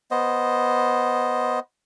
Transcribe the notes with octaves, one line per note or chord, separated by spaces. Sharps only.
B3 C5 D#5